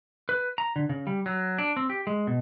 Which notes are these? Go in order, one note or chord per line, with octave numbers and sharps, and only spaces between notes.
B4
A#5
D3
C#3
G3
F#3
D4
C4
G4
G#3
B2